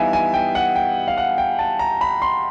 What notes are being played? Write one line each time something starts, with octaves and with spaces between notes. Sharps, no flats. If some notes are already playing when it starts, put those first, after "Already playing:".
Already playing: E3 G3 B3 D#4 E5 F5 G#5
G#5
G5
F#5
G5
F5
F#5
G5
A5
A#5
B5
C6